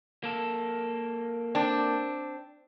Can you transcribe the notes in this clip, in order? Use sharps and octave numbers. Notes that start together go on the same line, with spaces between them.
A#3 A4
C4 D4